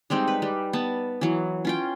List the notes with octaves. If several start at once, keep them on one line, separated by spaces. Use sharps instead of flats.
G3 G#3 C4 D#4
B4
G3
B3 A5
E3 F#3
C#4 F4 G5